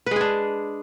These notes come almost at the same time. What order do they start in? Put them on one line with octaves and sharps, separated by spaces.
B4 G#3 G#4 D4